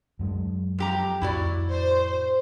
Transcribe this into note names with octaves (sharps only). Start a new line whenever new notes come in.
F#2 F#3 G#3
F2 G4 A#5
F2 A2 E4 F#4 D5
C5